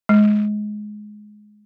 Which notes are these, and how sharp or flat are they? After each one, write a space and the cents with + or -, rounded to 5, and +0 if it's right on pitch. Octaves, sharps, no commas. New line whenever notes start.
G#3 +15